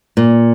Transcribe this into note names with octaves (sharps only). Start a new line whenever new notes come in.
A#2